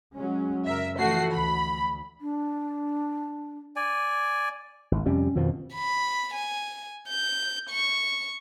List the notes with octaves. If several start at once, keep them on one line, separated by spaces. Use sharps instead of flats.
F#3 G#3 C#4
F#2 C#3 A#4 E5
E3 F3 A3 F#4 C7
D2 B5
D4
D5 G#5
G#1
F2 C3 G3 C#4
F2 B2 D#3 F3
B5
G#5
G6
C#6